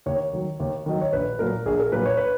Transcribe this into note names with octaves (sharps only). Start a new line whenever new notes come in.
D#2 C#5
D#3 F#3
D#2
D#3 F#3 D#5
C#5
A#1 B4
A#2 F#3 A#4
A#1 G#4
A#4
A#2 F#3 B4
C#5
B4